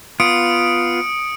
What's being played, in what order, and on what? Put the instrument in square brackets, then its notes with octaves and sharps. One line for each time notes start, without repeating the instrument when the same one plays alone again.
[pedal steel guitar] B3 F4 [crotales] D#6 C#7 D7